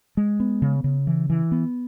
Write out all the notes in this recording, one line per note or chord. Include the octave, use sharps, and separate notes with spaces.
G#3
B3
C#3
C#3
E3
E3
B3